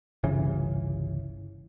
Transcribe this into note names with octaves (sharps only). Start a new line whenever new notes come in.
G1 C2 C#3 E3